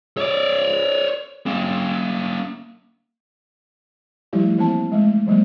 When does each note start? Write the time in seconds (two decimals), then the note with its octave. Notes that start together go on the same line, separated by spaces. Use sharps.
0.17 C#5 D5
1.46 A#3 C#4
4.33 F3 G3 A3 E4 G4
4.58 E3 A#3 C4 E4 A5
4.92 G#3 A3
5.27 E3 F#3 G#3 A#3